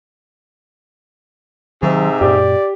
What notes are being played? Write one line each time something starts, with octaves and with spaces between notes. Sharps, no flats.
G#2 C3 D#3 F#3 E5
F#2 A#2 G4 D5